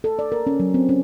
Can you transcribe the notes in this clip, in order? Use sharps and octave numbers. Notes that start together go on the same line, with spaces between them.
A4
D5
A#4
C#4
F#3
C4
C#4